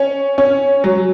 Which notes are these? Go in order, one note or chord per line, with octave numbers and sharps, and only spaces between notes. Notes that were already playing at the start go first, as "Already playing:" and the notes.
Already playing: C#4
C#4
F#3